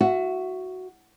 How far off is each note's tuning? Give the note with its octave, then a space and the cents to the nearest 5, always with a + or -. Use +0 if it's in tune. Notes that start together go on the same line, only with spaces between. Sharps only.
F#4 +0 E5 +25